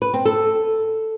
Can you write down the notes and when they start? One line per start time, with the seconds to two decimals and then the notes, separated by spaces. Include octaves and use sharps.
0.02 B4
0.14 C4
0.25 A4